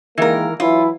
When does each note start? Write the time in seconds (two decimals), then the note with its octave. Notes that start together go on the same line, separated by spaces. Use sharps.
0.18 D#3 E3 G#3 A#3 A#4
0.60 E3 F#3 E4 F4